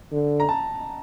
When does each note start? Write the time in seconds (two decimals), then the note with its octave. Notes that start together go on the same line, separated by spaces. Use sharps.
0.12 D3
0.40 A#5
0.49 A5